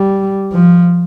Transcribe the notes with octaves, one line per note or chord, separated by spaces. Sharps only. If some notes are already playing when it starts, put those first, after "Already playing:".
Already playing: G3
F3